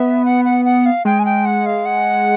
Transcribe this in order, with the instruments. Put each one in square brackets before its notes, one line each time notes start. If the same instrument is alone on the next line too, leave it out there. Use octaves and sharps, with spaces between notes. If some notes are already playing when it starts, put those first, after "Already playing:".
Already playing: [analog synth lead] B3 [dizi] E5
[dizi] F#5
F#5
F#5
F5
[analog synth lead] G#3 [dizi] G5
[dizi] G#5
G5
F#5
F5
F#5